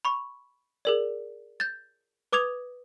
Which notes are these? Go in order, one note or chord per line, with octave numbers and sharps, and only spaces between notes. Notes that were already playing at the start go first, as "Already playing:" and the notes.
B5 C#6
G#4 A#4 D5
G6 A6
B4 D6 D#6 G#6 F7